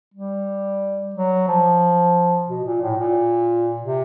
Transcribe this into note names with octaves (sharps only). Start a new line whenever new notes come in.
G3
F#3
F3
B2
A#2
A2
A#2
C3